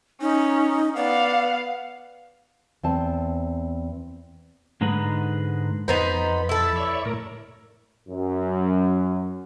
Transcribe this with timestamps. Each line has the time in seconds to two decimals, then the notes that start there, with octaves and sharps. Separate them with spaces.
0.21 C#4 D#4
0.97 B3 D5 F5
2.83 E2 C4 A5
4.81 G#2 D3 G#3 D#4 G#4 B4
5.88 F2 B3 D#4 C5 B5
6.49 E4 A4
6.76 C#5 D5 E5
7.05 A2 A#4
8.09 F#2